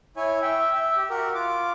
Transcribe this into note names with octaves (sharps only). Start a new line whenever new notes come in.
E4 C#5 G#5
E5 G5
E5
G4
F#4 A#4
F4 D6